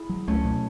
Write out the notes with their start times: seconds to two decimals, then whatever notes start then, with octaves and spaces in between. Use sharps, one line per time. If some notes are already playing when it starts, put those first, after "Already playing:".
Already playing: E4 G#4
0.09 F#3
0.27 C#2 A3 C#4
0.45 B2